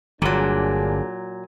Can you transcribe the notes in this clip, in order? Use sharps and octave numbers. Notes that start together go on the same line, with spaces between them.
G1 A#2 D3 F#3 A#3 D4 G#4